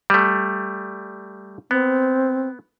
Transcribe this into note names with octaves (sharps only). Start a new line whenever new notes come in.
G3 A3
B3 C4